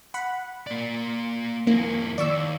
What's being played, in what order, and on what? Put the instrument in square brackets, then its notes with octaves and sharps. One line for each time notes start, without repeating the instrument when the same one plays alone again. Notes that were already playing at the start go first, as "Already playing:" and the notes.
[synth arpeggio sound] F#5 B5
[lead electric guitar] A#3 D5
[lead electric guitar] F2 E4 [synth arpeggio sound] A#3
[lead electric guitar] D#2 [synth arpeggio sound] D5 C#6 E6